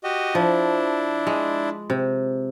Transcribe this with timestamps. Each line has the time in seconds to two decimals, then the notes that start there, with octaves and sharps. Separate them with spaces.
0.04 F#4 G4 D#5
0.35 F3 D4 E4
1.27 G#3
1.90 C3